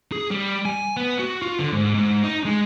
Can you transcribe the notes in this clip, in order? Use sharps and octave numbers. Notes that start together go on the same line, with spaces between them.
G#4
G3
G#5
B3
F#4
F4
D3
G#2
G#2
D#4
G#3